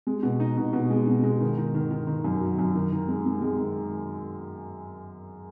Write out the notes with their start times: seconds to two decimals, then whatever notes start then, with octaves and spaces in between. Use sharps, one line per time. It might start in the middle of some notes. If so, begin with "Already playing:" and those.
0.07 G#3
0.23 B2
0.40 D#4
0.57 B2
0.73 B2
0.90 G#3
1.07 B2
1.23 G#3
1.41 D#3
1.58 D#3
1.75 D#3
1.91 D#3
2.07 D#3
2.24 F#2
2.41 F#3
2.59 F#2
2.75 D#3
2.92 D#3
3.08 G#3
3.25 G#3
3.42 G#3
3.59 D#3